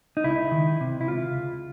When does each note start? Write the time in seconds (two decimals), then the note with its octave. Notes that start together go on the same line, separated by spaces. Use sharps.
0.17 D#4
0.24 C#2 E4
0.52 D#3
0.81 C3
1.01 E4
1.08 C#2 F4
1.37 C#2